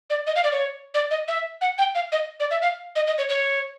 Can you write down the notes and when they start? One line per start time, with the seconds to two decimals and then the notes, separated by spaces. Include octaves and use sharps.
0.10 D5
0.27 D#5
0.36 F5
0.44 D5
0.52 C#5
0.94 D5
1.11 D#5
1.28 E5
1.61 F#5
1.78 G5
1.95 F5
2.12 D#5
2.40 D5
2.51 E5
2.62 F5
2.96 D#5
3.07 D#5
3.18 C#5
3.29 C#5